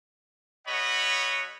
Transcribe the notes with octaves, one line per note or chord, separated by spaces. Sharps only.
A3 F#4 C#5 D#5 F#5 B5